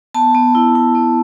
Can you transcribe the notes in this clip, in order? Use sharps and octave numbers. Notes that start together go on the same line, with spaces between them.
B3 A5
B3
E4
E4
B3